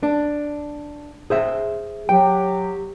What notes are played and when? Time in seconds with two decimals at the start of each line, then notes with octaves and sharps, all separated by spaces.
0.03 D4
1.30 G#4 C5 E5
2.09 F#3 G4 G5